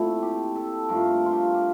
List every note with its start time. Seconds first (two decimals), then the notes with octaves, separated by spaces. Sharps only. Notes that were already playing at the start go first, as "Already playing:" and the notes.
Already playing: A#2 A3 C4 E4
0.22 G4
0.56 A4
0.89 G2 F3 A3 A#4
1.26 F4
1.33 G4
1.55 G4